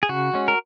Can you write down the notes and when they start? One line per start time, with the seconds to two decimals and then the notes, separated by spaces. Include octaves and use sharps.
0.03 G#4
0.09 C#3 F#4
0.34 G#3 C#4
0.48 A#4